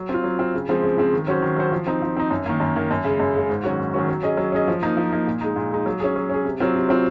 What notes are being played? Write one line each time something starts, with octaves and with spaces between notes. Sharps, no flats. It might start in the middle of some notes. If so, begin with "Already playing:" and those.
Already playing: F#3
C4 F4
F#3
C4 F4
C#3
F3 G#3 C4
C#3
F3 G#3 C4
D#3
F#3 C#4 F#4 C5
D#3
F#3 C#4 F#4 C5
F3
C4 D#4
F3
C4 D#4
F#2
D#3 A#3
F#2
D#3 A#3
F#2
C#3 G#3
F#2
C#3 G#3
G#2
D#3 F#3 C#4 F#4
G#2
D#3 F#3 C#4 F#4
F#3
C#4 G#4 D#5
F#3
C#4 G#4 D#5
F3
A#3 D#4
F3
A#3 D#4
A#2
G#3 D#4
A#2
G#3 D#4
F#3
C#4 G#4
F#3
C#4 G#4
C3
F#3 C4 F4
C3
F#3 C4 F4